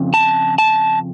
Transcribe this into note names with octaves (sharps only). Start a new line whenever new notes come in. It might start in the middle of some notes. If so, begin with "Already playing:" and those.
Already playing: F2 C#3
A5
A5